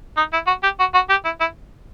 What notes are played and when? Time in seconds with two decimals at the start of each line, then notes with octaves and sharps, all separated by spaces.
0.17 D#4
0.33 E4
0.47 F#4
0.63 G4
0.79 F#4
0.94 F#4
1.10 G4
1.25 E4
1.40 E4